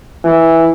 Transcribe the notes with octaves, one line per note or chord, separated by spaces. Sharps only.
E3